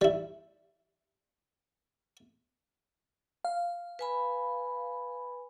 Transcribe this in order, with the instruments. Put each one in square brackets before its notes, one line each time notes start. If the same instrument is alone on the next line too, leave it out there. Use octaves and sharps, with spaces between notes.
[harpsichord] G3 E4
[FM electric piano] F5
[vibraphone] B4 G#5 B5